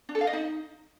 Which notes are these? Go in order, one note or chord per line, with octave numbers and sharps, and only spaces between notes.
D4
A4
F5
D#5
D#4